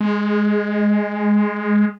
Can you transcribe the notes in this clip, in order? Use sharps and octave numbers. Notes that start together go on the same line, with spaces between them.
G#3